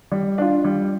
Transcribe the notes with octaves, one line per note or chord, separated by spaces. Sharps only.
G3
D4 F4
G3